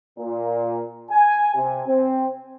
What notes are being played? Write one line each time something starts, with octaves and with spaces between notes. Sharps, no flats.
A#2
G#5
C3
C4